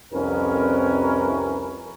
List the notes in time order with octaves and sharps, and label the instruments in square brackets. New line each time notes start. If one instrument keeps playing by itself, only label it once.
[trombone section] C2 F2 F3 C#4 A#4 B4